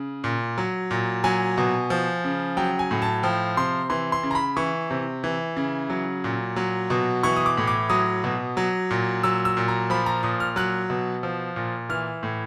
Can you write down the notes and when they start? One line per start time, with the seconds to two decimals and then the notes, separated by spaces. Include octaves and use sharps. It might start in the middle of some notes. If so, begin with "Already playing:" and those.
Already playing: C#3
0.24 A#2
0.58 F#3
0.91 A#2
1.24 F#3 G#5
1.58 B2
1.90 F3
2.24 C#3
2.57 F#3 G5
2.79 G#5
2.91 A2
3.02 A5
3.23 F3 G5
3.57 C3 C6
3.90 E3 C6
4.12 C6
4.23 C#3
4.31 A#5
4.35 B5
4.57 E3 C#6
4.90 C3
5.24 E3
5.56 C#3
5.90 F#3
6.24 A#2
6.56 F#3
6.90 B2
7.23 E3 C#6
7.36 D#6
7.46 D6
7.57 A2
7.67 D6
7.89 F#3 D#6
8.24 B2
8.57 F#3
8.91 A#2
9.23 F#3 E6
9.45 E6
9.57 A#2
9.68 A#5
9.90 F3 B5
10.06 A#5
10.23 A#2 D#6
10.40 F6
10.56 F#3 F#6
10.90 B2
11.23 F3
11.56 A#2
11.89 E3 F6
12.23 A2